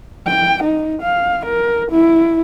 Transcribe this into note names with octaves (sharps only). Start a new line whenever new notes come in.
G5
D#4
F5
A#4
E4